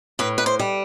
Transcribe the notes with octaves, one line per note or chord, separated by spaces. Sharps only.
A2 B4
B4
C5
G3